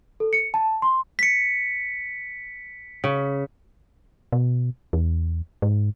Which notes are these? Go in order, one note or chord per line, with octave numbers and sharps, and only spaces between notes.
A4
C#7
A5
C6
B6 C#7
C#3
B2
E2
G#2